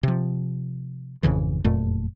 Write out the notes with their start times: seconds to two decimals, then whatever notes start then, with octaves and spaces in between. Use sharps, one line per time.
0.03 C3 F3
1.23 G#1 F2 C#3 E3
1.64 F#1 F2 A#2 A3